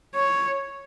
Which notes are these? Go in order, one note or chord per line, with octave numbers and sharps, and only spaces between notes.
C#5